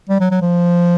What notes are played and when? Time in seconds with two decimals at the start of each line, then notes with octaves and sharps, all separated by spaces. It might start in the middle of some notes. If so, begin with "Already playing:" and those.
0.10 G3
0.20 F#3
0.31 F#3
0.42 F3